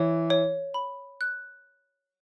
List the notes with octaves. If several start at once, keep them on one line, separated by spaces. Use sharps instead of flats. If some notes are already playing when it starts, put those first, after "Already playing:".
Already playing: E3 C#5
C#5
B5
F#6